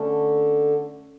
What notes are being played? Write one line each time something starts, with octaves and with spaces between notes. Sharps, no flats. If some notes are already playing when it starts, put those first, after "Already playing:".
Already playing: D3 A3 C#4 A4